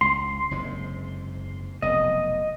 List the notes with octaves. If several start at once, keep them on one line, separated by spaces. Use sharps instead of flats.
C#2 C6
F#1 G#2 C3
F1 B1 D#5